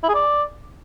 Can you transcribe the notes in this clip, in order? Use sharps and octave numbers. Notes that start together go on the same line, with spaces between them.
E4
G#4
D5